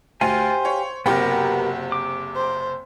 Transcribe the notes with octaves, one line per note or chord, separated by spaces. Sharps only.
D2 G4 C5 F5 G#5
C#5
F#1 C3 B3 F#4 G4 A#4 G5
D6
C5